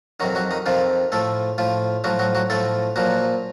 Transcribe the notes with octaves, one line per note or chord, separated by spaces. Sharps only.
F2 C3 D#3 F#3 F#4
F#3 F#4
D#3 D#4
F2 C3 D#3 F3 F4
A2 F3 A3 A4
A2 F3 F4
A2 F3 F#3 F#4
F#3 F#4
F#3 F#4
A2 F3 A3 A4
A#2 F3 F#3 F#4